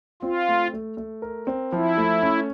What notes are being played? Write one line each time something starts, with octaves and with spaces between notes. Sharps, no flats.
C4 F4
A3
A3
A3
A#4
C4
F3 E4
A3
C#4